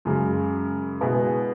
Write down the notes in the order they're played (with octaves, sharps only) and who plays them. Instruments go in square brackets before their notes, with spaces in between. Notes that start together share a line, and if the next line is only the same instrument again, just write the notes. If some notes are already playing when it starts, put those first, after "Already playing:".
[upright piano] F#2 C#3 G#3
B2 G#3 B3 E4 G#4